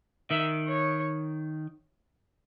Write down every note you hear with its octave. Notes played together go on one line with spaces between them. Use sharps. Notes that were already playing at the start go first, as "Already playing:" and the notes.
D#3 E5
C#5